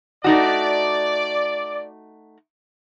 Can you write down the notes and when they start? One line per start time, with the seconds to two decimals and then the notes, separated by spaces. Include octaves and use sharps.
0.24 A3 D#4 F#4 D5